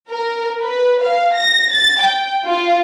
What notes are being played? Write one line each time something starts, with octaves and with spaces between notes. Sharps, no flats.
A#4
B4
F5
A#6
A6
G5
F4